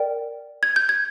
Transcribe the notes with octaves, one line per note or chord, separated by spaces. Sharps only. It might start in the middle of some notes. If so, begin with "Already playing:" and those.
Already playing: A#4 D5 G5
G#6
G6
G#6